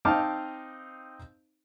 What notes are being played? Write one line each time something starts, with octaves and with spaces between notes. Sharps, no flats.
C4 D#4 F5 A5 D6 F6